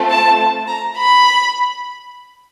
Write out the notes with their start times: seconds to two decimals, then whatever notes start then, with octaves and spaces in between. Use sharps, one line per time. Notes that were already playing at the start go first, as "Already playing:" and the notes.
Already playing: A3 C4 F4 A4
0.09 A5
0.68 A#5
0.97 B5